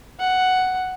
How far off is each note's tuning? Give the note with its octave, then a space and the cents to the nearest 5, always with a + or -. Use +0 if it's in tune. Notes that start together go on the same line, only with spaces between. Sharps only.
F#5 +5